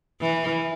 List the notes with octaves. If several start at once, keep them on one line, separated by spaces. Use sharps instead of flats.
E3